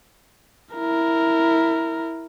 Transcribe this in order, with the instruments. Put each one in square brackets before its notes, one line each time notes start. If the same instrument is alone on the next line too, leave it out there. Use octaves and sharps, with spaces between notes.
[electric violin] E4 A#4